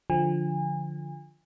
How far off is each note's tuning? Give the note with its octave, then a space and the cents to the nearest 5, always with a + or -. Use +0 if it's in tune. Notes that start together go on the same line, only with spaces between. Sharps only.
D3 +0 F3 +0 G#5 -35